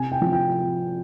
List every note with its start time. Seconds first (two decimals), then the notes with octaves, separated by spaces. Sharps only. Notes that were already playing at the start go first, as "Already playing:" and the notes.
Already playing: C3 G#5
0.12 G5
0.21 F3
0.32 G5